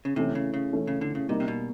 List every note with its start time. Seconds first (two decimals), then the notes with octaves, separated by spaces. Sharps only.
0.05 C#3
0.16 C3 E3 A3 C#4 E4
0.35 C#3
0.54 C#3
0.73 E3 A3 C#4 E4
0.87 C#3
1.01 D3
1.15 C#3
1.29 C3 G3 A#3 D#4
1.40 C3
1.48 B2